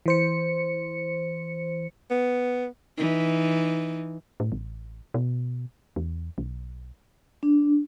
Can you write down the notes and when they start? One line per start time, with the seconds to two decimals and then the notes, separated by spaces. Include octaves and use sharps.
0.06 E3 C5 C#7
2.10 B3
2.98 E3 D#4
4.40 A2
4.52 A1
5.14 B2
5.96 E2
6.38 B1
7.43 D4